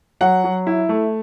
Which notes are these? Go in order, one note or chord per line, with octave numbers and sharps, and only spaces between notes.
F#3 F#5
F#3
E4
A3